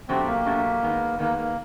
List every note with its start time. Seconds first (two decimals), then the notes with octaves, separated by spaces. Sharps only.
0.08 B2 F#3 A3 C4 D4 G4
0.26 A#3
0.45 B2 F#3 A3 D4 G4
0.83 D#3 G#3 B3 D#4
1.19 D#3 G#3 A#3 B3 D#4
1.38 A#3